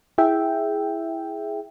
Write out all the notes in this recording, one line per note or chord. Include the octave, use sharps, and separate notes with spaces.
E4 G#4 E5 G5